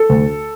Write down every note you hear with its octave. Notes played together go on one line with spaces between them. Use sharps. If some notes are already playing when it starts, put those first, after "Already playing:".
Already playing: A4
D2